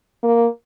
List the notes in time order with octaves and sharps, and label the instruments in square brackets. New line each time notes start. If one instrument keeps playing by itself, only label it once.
[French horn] A#3